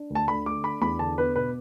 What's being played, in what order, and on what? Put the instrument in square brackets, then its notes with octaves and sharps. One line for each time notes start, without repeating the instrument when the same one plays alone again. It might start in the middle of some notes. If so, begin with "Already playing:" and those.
Already playing: [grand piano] D4
D2
A5
D3 B5
A3 D6
D4 B5
E2 B5
D3 A5
B3 B4
B2 B4